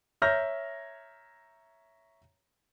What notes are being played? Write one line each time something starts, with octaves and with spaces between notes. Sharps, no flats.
C#5 E5 A#5 F6 G6 A#6